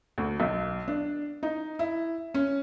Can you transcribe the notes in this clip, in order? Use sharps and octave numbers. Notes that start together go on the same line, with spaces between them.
D2
B1
D4
D#4
E4
C#4